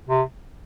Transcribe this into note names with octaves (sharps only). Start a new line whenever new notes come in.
C3